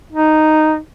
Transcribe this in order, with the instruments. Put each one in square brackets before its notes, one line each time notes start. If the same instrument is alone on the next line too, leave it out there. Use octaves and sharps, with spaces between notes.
[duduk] D#4